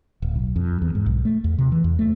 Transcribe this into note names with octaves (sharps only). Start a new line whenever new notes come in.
D1
B1
F2
E2
G#2
B1
A3
E2
C3
E3
E2
A3